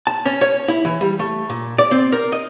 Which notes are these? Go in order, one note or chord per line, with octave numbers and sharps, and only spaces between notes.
A5
C#4
C#5
E4
E3
G3
A3
A#2
D5
C4
A#4
D#5